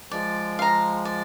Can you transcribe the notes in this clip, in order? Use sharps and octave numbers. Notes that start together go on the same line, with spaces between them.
F3 G#3 D5
F5 A#5
D5